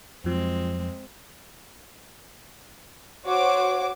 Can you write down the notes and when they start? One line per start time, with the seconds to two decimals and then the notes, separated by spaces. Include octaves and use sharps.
0.24 F2 F3 F#3 G#3 C4
3.25 F#4 C5 C#5 D6